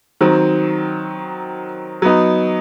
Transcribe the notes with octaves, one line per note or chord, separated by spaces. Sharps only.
D#3 F#3 C4
F#3 B3 D#4